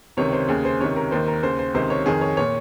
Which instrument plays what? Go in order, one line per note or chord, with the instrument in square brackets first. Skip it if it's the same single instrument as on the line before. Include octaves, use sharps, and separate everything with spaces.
[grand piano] C#2 C3 D#3 C#5
C5
D#2 C#3 G#4
C5
C#2 C3 D#3 C#5
A#4
D#2 D#3 C5
A#4
D#2 C#3 C5
C5
C#2 C3 D#3 C5
C#5
F2 D#3 G#4
C#5
A#2 C#5